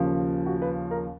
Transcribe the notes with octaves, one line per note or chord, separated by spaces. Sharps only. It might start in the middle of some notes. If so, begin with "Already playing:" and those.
Already playing: D#2 C#3 F3
F#4
B4
A#4